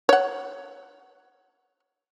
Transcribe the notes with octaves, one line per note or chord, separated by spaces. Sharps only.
C#5 F#5